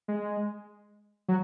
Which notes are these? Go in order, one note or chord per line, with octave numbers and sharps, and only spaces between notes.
G#3
F#3